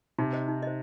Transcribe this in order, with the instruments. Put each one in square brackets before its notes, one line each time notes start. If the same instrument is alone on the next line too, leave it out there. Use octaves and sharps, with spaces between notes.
[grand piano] C3 [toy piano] D#4
[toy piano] C5 D#5
D#4
C5 D#5